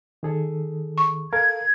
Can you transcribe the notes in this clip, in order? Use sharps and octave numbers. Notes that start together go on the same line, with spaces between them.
D#3 G#4 A4
C#6
A4 A#4 F5 G#6